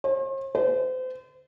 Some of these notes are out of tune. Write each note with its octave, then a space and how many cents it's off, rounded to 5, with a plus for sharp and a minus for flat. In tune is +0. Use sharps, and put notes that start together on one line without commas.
C5 +45
C5 -35